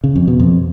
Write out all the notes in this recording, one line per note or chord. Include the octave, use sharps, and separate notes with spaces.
C#3
F2
B2
F2